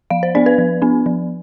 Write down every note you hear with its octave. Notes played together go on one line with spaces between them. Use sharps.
F3 F5
C5
B3 D4 D5
B4
F3
B3 D4
F3